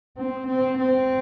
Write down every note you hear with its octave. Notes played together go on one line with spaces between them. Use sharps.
C4
C4
C4